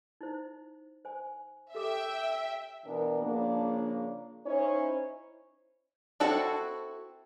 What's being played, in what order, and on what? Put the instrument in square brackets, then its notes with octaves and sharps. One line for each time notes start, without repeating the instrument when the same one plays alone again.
[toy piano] D#4 E4 C5
C5 G#5
[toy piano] G4 A4 D6 [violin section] E5 G5
[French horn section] B2 E3 B3 D4 A#4
C#3 F3 A#3 D4
C#4 D#4 E4 C5 C#5
[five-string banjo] C4 E4 F#4 A4